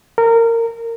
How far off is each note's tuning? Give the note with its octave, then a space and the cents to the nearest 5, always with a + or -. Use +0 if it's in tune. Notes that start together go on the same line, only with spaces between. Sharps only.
A#4 -20